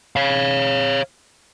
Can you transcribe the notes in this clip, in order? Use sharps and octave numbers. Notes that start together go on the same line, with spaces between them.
C#5 F5